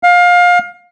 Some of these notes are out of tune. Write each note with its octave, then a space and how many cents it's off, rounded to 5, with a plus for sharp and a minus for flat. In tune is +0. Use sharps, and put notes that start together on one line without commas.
F5 +25